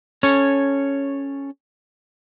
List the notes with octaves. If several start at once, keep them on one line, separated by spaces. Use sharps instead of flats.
C#4 A4 C#5